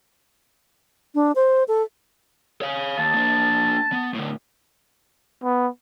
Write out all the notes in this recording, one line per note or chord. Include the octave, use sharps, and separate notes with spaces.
D4
C5
A4
C#5 F5
D#2 A5
A#3 D4
B3
A2 D3
B3